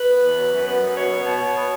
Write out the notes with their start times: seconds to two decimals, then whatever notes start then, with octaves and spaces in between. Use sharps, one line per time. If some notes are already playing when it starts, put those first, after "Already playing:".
Already playing: B4
0.09 B3
0.22 E2
0.37 F#3
0.53 F#2
0.67 B3
0.81 F#2
0.96 B2 C#5
1.11 B3
1.26 B2
1.41 B2
1.55 B3